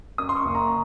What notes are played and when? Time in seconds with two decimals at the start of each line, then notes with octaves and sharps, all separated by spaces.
0.18 F#2 D#6
0.29 C6
0.36 C#6
0.45 F#1
0.55 A#5